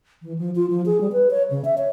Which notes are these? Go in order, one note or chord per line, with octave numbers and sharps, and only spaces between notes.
E3
F3
F4
F3
G#4
G3
B4
C#5
C#3
E5
C#5